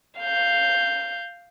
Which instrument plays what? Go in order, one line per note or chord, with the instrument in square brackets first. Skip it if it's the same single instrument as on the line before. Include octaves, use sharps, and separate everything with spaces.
[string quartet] F5 G6